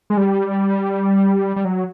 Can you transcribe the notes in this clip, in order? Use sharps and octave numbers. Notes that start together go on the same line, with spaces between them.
G#3
G3
G3
F#3